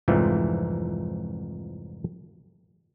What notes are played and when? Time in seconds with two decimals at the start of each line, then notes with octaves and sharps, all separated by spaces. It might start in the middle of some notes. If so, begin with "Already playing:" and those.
0.08 C2 F2 G#2 E3 F3 A3